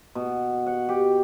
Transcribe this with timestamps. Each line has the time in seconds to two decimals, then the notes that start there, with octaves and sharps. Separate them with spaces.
0.15 B2
0.66 F#5
0.89 G4